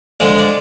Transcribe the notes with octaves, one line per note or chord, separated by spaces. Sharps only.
D3 F3 G#3 D5
D5